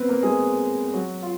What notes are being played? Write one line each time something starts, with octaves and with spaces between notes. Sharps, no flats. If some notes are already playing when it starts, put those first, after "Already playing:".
Already playing: B3 C4 B4
A#3 A#4
G#3 G#4
F#3 F#4
F4